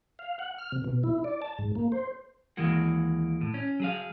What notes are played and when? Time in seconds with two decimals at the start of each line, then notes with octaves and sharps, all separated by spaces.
0.19 F5
0.39 F#5
0.58 F6
0.72 C3
0.84 B2
1.03 E4
1.24 D5
1.42 A5
1.58 G#2
1.75 A#3
1.92 C5
2.57 D#2 E3 G#3 A#3 F#4
3.41 A2
3.54 C#4
3.80 F#3 G#4 F5